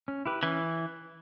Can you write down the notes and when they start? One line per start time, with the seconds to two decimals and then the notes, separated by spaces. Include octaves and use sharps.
0.08 C#4
0.26 E4 G4 B4
0.43 E3 C#4